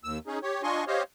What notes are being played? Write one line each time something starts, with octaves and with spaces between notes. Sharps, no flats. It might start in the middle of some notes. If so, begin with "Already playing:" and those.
D#2 E6
C#4 D#4 G#4
G4 C#5
D4 F4 D#5 G#5 C6 C#6
G4 C5 C#5 D#5 F5